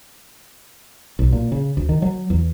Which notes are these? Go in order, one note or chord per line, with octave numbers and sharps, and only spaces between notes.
B1
A#2
C#3
D2
D#3
F#3
E2